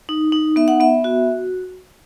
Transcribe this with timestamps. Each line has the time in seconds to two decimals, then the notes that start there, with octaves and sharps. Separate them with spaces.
0.09 D#4
0.32 D#4
0.56 B3 E5
0.68 F#5
0.80 B3 E5
1.04 F#4